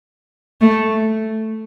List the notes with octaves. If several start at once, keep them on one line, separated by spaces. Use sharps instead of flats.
A3